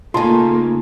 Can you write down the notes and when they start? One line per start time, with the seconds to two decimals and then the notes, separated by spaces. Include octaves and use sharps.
0.14 C#3 A3 A#3 D#4 F4 G#5 A5 C6